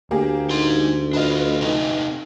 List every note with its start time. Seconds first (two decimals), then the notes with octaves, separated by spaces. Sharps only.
0.11 D2 A#3 G4 G#4
0.50 D#4 C6
1.13 D4 F4 B4 D#5
1.61 C3 D#4